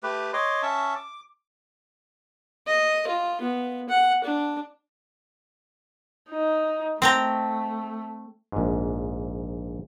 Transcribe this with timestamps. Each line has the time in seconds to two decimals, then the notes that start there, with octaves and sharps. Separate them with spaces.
0.03 A3 G4 B4
0.33 C#5 D#5 C6 D6
0.62 C#4 E5 A5 C#6
0.96 D6
2.67 D#5
3.08 F4
3.41 B3
3.90 F#5
4.24 D4
6.30 D#4
7.02 A3 C4 G5 A#5
8.52 A#1 G#2